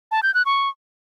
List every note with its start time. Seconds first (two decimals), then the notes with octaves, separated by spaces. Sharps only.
0.11 A5
0.23 G6
0.34 F#6
0.46 C#6